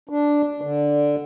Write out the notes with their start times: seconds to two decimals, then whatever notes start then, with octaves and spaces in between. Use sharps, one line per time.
0.09 D4
0.62 D3